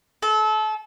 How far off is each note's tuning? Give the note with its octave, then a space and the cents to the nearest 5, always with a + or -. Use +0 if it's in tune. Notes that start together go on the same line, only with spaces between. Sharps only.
A4 -30